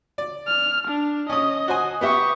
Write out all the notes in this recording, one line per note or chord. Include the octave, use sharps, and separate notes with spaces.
D5
F6
D4
C#4 D#5 D#6
F#4 C5 G#5
B3 G4 E5 C#6 D#6